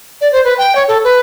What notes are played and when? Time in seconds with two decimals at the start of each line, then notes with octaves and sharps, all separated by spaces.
0.21 D5
0.33 C5
0.45 B4
0.58 G5
0.76 C#5
0.88 A4
1.04 B4